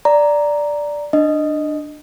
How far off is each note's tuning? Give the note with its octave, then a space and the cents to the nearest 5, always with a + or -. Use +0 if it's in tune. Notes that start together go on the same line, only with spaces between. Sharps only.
D5 +0 A#5 +0
D4 +20 D#5 +0